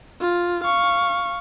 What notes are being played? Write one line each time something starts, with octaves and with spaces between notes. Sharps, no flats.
F4
F5 C#6